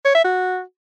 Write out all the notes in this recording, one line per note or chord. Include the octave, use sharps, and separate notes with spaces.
C#5
E5
F#4